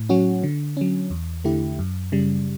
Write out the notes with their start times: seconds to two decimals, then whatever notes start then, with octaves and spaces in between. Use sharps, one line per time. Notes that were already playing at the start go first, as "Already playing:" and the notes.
Already playing: A2
0.09 F#3 C#4 F#4
0.43 D3
0.77 F#3 C#4
1.10 E2
1.44 D3 A3 E4 G4
1.79 F#2
2.12 C#3 G3